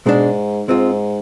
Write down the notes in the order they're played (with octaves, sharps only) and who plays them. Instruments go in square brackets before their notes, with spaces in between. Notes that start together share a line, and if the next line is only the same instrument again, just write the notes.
[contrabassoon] G#2 [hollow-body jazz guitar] B2 G#3 D4
[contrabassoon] G#2 [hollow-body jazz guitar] G#3 C4 F4